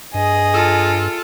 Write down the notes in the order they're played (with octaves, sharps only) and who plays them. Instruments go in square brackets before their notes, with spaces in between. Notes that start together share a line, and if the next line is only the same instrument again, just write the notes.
[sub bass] G2 [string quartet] G#4 D#5
[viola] F4 A4